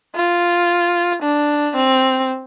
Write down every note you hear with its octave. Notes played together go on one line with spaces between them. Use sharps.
F4
D4
C4